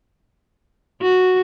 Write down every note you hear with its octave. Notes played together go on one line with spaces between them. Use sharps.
F#4